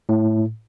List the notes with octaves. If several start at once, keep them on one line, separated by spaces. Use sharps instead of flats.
A2